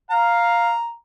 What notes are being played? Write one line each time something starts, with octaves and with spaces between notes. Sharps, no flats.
F5 A#5